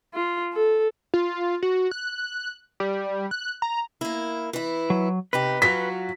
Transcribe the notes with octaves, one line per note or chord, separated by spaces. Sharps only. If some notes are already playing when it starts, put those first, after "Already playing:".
F4
A4
F4
F#4
F#6
G3
F#6
A#5
A#3 E4
E3 E4
F#3
C3 D#4 G4 B4
F#3 F4 F#4 B6